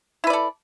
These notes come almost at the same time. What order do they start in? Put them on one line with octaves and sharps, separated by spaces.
E4 B4 D5 A4